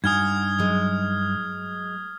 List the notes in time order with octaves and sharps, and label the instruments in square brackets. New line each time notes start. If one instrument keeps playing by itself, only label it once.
[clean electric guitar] G2 D#4 G#5 [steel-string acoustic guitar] F#4 [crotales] D#6 F6 G#6
[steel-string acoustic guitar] F#3 G#3